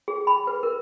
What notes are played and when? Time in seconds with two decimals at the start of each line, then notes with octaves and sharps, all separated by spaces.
0.08 G#4
0.27 B5
0.47 B4
0.63 A#4